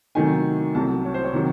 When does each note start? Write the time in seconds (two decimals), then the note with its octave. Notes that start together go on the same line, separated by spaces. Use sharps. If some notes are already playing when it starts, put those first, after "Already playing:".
0.15 C3 D#3 F#3 A3 D#4 G#5
0.75 C2 C3 F#3 A5
1.05 C#5
1.14 C5
1.24 C#5
1.33 C3 D#3 F#3